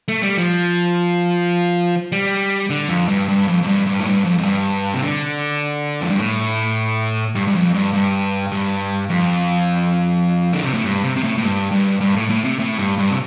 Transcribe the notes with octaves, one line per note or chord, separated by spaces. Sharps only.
A3
G3
F3
G3
D3
F2
G2
G2
F2
F2
G2
G2
A2
G2
F2
F2
G2
C3
D3
F2
G2
A2
G2
G2
F2
G2
G2
G2
F2
D3
C3
A2
G2
C3
C3
A2
A2
G2
G2
G2
A2
A2
C3
A2
G2
G2
C3